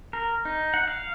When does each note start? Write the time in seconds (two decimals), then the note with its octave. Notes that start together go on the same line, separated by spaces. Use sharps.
0.13 A#4
0.45 D#4
0.74 F#5
0.88 F5